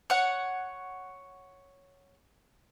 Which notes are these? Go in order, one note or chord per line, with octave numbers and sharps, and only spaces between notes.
C#5 F#5